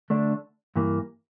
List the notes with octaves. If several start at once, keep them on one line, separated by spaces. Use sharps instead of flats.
D3 A3 D4
G2 E3 A#3